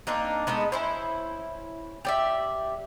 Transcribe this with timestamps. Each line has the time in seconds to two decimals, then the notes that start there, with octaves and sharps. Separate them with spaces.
0.07 A#3 C4 D4 D#4
0.47 G#3 B3 D#4 A4
0.72 C#4 E4 C5
2.05 G4 D5 E5